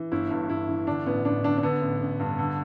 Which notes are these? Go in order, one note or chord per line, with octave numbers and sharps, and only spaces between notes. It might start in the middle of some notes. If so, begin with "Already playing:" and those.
Already playing: E3
G1 E4
G2
G1 E4
E3
D3 D4
A1 B3
A1 D4
D3 D4
D4
D3 B3
A1
A1
G2
D3